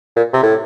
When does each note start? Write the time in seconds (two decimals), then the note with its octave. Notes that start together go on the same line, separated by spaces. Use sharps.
0.16 A#2
0.33 C3
0.42 A2